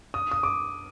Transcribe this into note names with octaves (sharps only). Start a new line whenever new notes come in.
D#6
D#6
D6